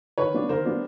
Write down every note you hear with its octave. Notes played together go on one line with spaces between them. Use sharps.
D#3 B4 C#5
G3 B3 D4
D#3 A#4 C5
G3 B3 D4